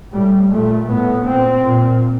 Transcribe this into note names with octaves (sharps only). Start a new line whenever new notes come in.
A2 G3
A#2 A3
A2 B3
A#2 C4
A#2